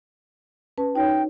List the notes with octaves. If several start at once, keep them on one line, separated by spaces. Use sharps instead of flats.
C#4 B4 A5
D#4 F#4 C#5 G5